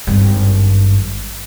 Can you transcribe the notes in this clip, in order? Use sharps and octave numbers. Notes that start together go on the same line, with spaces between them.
G#1 G2